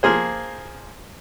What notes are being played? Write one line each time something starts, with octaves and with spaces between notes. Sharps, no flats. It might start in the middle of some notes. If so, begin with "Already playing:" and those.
F3 A#3 G#4 C5